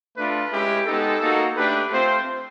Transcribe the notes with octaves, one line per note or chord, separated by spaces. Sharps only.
A3 D4 F4 B4
G#3 C#4 E4 G4
G#3 B3 D#4 G4 A4
A#3 D#4 F#4
A3 D4 G4 B4
A3 C4 F4 C5